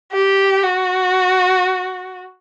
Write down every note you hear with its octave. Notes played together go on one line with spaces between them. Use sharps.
G4
F#4